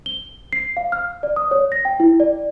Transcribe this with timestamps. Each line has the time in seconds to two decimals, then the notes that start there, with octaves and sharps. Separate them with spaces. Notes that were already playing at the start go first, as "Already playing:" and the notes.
0.06 G7
0.53 C7
0.77 F5
0.92 F6
1.23 D5
1.36 D#6
1.51 C#5
1.72 A#6
1.85 G5
2.00 E4
2.20 D5